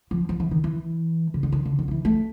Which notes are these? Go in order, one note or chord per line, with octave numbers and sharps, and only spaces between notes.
F3
F3
E3
D#3
E3
C#3
D3
D#3
D3
D#3
F3
E3
A3